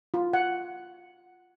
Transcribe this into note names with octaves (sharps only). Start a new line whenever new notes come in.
F4
F#5